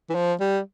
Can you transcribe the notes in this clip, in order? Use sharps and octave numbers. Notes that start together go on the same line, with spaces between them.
E3
F3
G3